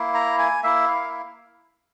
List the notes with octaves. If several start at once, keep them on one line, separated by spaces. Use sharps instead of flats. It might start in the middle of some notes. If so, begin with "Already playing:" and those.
Already playing: A#3 E4
A#5
G#5
A#3 E4 E5
F5